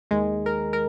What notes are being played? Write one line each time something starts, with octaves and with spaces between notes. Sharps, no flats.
D#2 D#3 G#3
A#4
A#4